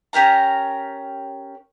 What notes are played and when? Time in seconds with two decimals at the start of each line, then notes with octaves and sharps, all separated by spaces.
0.13 C#4 G4 A#4 A#5